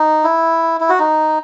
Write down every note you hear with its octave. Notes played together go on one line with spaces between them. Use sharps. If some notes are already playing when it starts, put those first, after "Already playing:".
Already playing: D#4
E4
E4
F#4
D#4